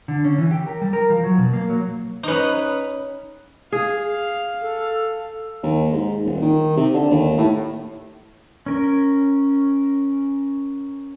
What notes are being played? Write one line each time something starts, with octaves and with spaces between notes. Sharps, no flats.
D3
C#4
E3
G4
A#4
G3
A#4
F3
F#3
B2
A#3
F#3
C#4 D#4 B4 D#6
G#4 F5
A4
D#2
G#2
D#1
D#3
C3
D3
D#2
A2
C#4 A#4